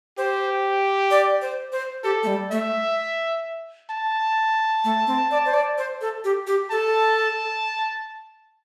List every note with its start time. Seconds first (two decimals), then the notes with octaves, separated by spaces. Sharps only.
0.18 G4 C5
1.11 D5
1.42 C5
1.72 C5
2.04 G4 A4
2.23 A3
2.27 G3
2.51 A3 E5
3.90 A5
4.84 A3
5.07 C4
5.31 D5
5.46 C5
5.54 D5
5.78 C5
6.01 A4
6.24 G4
6.47 G4
6.71 A4 A5